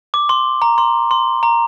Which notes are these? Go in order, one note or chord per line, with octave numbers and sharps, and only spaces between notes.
D6
C6
A#5
C6
C6
A#5